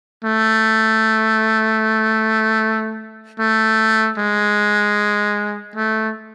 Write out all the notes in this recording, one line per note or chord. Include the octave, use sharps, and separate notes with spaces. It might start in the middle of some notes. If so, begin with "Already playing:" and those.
A3
A3
G#3
A3